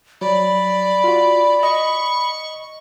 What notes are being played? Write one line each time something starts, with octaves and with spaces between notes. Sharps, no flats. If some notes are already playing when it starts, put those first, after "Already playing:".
F#3 D5 B5
F4 F#4
D#5 C#6